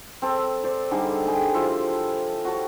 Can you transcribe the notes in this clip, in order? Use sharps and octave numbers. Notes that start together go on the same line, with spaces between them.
C4 A4
C5 D5
D3 G3 D#4 G#4
G4 G#4 G5 B5
F3 E4 A4 C6
F#4 G4 C#5 A5